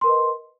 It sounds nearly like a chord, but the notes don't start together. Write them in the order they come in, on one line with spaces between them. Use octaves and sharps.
C6 A#4 B4 D#5